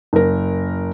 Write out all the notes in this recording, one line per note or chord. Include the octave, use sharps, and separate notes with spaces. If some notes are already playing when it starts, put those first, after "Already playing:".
F#1 A#4